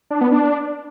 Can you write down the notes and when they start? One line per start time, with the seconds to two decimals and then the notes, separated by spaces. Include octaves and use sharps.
0.10 D4
0.21 B3
0.32 D4